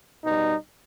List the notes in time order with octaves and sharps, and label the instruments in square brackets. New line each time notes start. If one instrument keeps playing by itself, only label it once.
[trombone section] B2 G3 D#4